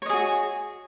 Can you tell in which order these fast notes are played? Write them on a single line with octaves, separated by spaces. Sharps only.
C#5 D#5 G#4 F#4